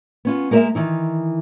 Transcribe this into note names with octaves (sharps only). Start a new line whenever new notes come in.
B3 C#4 F4
G#3 A#3 A#4 D5 E5
D#3 E3 D#4